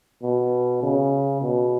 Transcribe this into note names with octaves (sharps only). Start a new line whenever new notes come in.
B2
C#3
B2